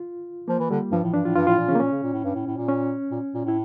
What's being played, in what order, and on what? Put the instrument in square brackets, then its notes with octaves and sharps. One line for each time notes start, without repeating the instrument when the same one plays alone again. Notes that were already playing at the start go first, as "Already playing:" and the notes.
Already playing: [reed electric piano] F4
[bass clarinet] F3 [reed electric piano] A#3
[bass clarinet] E3
[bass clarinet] D3 [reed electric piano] G3
[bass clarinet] G2 [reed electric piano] F3
[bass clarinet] A2 [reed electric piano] E3
[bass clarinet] G2 [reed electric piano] D4
[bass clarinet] A2 [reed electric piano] F4
[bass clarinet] G2 [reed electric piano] F4
[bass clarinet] A2 [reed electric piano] F4
[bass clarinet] A#2
[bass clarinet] C#3 [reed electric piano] C#4
[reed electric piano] A#3
[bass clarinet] A#2 [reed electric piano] C#4
[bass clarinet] C#3
A#2
A2
G2
A2
A2
A#2
[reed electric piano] C#4
[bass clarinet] A#2
A#2
[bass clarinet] A2 [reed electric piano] E4